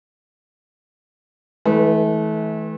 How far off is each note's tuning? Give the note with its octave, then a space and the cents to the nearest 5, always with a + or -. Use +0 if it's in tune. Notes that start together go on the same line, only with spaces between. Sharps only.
E3 -35 A3 -30 B4 +0